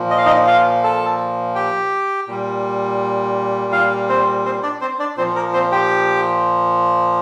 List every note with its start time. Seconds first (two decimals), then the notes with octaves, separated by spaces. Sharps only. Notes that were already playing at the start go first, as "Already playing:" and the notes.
Already playing: A#2 F3
0.11 D#5
0.18 F5
0.25 D#4 D#5
0.47 F4 F5
0.84 A4 A5
1.55 G4 G5
2.28 A#2 G3
3.72 F4 F5
4.09 C4 C5
4.45 C4 C5
4.63 D4 D5
4.81 C4 C5
4.99 D4 D5
5.17 A#2 F3 C4 C5
5.35 A#3 A#4
5.53 C4 C5
5.72 G4 G5